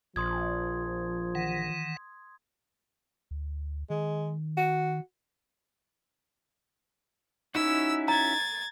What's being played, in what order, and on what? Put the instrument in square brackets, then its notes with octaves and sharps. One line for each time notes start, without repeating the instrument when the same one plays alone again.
[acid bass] A#1 [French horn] F3 [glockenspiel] C6 D#6 G#6
[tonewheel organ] D#3 E3 F#5
[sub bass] D2
[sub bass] D#3 [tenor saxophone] G#3
[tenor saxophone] F#4
[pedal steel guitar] C#4 E4 F#4 [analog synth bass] D#4 [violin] E6
[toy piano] A#5 [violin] G#6 A6